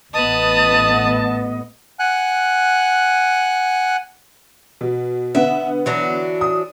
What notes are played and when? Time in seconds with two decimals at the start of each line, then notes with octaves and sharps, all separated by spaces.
0.14 A1 B3 B4 D#5 A5 D#6
1.99 F#5 G#5 F#6
4.81 B2
5.35 D3 B3 E5 F#5
5.86 E3 F#3 D4
6.41 D#6